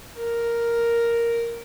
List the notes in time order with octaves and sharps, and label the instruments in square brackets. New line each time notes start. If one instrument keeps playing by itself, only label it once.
[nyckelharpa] A#4